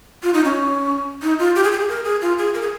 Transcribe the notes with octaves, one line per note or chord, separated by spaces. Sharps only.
F4
D#4
C#4
D#4
F4
G4
G#4
G4
G#4
A#4
G#4
F4
G#4
A#4
G#4